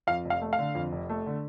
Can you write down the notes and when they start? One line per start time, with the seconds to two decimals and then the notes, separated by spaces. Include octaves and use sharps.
0.07 F2 F5
0.25 F1
0.30 F5
0.41 A3
0.53 F5
0.59 D3
0.75 F2
0.92 F1
1.09 A3
1.26 D3